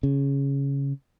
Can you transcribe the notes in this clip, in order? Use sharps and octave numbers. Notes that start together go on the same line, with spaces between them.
C#3